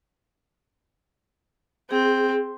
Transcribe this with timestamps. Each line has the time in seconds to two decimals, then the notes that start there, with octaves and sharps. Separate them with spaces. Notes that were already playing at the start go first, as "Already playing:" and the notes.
1.91 C4 G#4